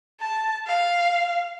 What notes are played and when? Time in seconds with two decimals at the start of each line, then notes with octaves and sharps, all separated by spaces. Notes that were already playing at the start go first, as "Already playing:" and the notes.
0.20 A5
0.67 F5